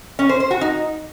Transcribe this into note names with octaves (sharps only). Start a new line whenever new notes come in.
C#4
C5
C5
F#4
D#4